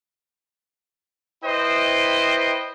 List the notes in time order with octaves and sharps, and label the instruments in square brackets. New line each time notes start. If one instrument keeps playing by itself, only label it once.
[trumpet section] E4 B4 C5 D#5 G5